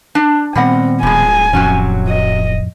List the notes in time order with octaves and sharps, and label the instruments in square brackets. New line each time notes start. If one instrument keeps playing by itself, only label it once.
[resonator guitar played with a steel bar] D4
[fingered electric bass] A#2 D#3 B3 [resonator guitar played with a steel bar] G3 D#5 F#5 [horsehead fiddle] C4
[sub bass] D1 [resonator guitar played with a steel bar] G2 G#3 [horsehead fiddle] G#5
[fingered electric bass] F2 A2 F3 [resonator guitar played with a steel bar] C3 F#3 C#4
[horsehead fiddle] D#5